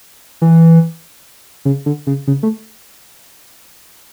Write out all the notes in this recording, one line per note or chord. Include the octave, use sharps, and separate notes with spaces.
E3
C#3
D3
C#3
C#3
A3